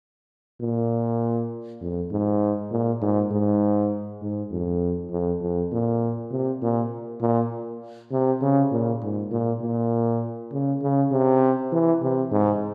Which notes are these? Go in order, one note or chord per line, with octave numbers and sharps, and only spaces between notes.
A#2
F2
G#2
A#2
G#2
G#2
G#2
F2
F2
F2
A#2
C3
A#2
A#2
C3
C#3
A#2
G#2
A#2
A#2
C#3
C#3
C3
E3
C3
G#2